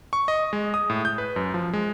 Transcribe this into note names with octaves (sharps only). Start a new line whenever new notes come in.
C#6
D#5
G#3
D#6
A2
G6
B4
F#2
F3
G#3